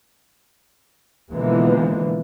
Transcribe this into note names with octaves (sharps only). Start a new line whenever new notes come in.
B2 D3 E3 F3 G#3 A#3